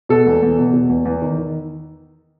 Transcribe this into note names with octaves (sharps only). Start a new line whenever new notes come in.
B2 A4
E2
E2
B2
B2
E2
E2
D#3
D#3